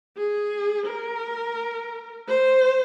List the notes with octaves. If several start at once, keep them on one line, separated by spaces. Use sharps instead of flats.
G#4
A#4
C5